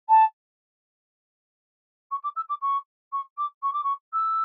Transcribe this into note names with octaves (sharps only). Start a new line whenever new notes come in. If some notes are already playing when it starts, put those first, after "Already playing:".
A5
C#6
D6
E6
D6
C#6
C#6
D6
C#6
D6
C#6
E6